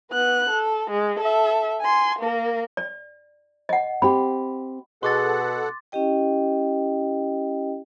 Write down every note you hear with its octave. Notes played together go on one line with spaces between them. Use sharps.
B3 F#6
A4
G#3
A4 E5
G#5 C6
A#3 A#4
D5
D#5 F#5
C4 G4 B5
B2 G#4 A4 F#5 C6 D6 A6
C#4 E4 G4 D#5 G5